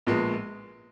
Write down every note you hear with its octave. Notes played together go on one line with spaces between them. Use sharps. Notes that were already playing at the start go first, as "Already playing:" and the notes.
A#1 A#2 F3 G#3 B3